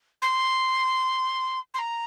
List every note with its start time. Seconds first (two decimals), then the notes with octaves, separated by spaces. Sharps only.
0.21 C6
1.73 C6
1.78 A#5